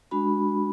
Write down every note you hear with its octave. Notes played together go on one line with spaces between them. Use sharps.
G#3 D4 F#4 B5